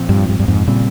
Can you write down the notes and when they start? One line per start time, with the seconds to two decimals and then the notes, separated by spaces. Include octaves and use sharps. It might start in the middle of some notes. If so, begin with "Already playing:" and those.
Already playing: A#2 F3 C4
0.09 G2
0.29 G2
0.39 G2
0.48 F2 G#2
0.68 A#2 C#3 G3 C4